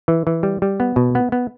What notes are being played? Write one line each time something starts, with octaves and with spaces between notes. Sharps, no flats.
E3
E3
G3
G3
B3
B2
B3
B3